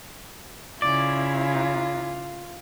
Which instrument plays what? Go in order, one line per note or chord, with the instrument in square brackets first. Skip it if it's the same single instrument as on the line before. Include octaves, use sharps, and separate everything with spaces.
[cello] C#3 E4 [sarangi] F4 [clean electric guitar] D5